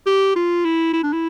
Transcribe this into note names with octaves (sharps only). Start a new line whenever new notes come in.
G4
F4
E4
E4
D4
E4